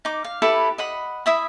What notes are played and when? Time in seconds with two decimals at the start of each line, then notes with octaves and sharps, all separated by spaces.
0.05 D#4 D6
0.24 F5
0.42 E4 G4 A4 B4
0.78 D#5 F#5 B5
1.26 E4 E5 D#6